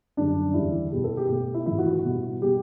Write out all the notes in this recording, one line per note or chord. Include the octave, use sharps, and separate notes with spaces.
F#2 D3 G3 D4
E2 D3 G3 E4
B2 G3 G4
A4
G4
B2 A3 G4
E4
A2 E3 A3 E4
F#4
F#4
B2 G3
B2 G3 G4